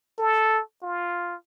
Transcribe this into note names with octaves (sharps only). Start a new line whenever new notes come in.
A4
F4